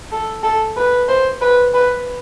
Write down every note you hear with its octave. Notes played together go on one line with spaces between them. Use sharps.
A4
A4
B4
C5
B4
B4